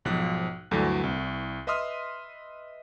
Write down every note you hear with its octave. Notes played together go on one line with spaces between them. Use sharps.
B1 G#2 F3 F#6
D2 G2 D3 E3 F#3 A3
C2
B4 D#5 E5 C6 D#6 F6